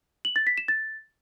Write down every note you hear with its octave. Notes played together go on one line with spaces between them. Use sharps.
F#7
A6
B6
E7
A6